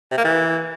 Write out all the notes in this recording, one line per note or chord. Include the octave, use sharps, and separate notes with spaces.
C3
A#3
E3